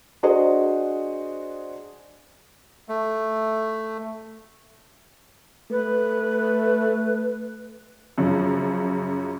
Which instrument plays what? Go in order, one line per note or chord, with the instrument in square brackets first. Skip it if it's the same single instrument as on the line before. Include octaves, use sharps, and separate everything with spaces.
[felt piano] D4 F#4 G#4 C5 D#5
[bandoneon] A3
[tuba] A3 [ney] B4
[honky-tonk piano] F#2 C#3 F3